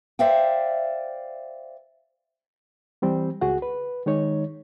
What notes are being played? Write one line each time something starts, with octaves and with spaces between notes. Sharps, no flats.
C5 D5 E5 F5 G5
E3 G3 C4
C#2 F#4 G#4 F#5
B4
D#3 G#3 D#4 C#5